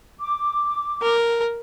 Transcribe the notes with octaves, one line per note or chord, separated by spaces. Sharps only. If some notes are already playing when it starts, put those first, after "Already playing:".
D6
A#4